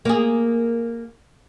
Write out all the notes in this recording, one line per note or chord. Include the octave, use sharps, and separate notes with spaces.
A#3 G#4